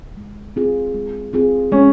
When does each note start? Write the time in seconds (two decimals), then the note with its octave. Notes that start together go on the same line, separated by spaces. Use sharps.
0.17 G#3
0.56 C4 F4 G#4
0.94 G#3
1.33 C4 F4 G#4
1.72 G#3 C#4